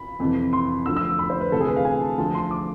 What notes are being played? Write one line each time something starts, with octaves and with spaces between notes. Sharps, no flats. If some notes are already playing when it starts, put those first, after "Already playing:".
Already playing: B5
F2 C3 E3
C6
D2 D3 F3 E6
E6
B5
C5
B4
D2 C3 E3 A4
G#4
B4
F5
G#5
A5
D2 D3 F3 A5
C6
D6